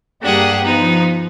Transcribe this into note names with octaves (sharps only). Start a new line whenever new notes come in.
G2 A#3 D4 G4 G#4 F#5
F3 B3 D#4